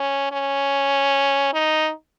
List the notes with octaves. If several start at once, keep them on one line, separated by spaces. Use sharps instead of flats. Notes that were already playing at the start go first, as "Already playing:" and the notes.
Already playing: C#4
C#4
D#4